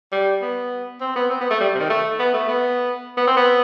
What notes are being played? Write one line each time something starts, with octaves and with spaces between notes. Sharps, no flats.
G3
B3
C4
B3
C4
B3
A3
G3
C3
D#3
A3
B3
A3
B3
B3
C4
B3